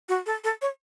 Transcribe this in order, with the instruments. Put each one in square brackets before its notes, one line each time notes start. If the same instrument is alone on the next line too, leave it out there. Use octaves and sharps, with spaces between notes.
[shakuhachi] F#4
A4
A4
C#5